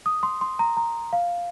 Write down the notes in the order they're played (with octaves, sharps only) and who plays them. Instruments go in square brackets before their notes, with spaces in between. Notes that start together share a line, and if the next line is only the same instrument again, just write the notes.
[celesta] D#6
C6
C6
A#5
A#5
F5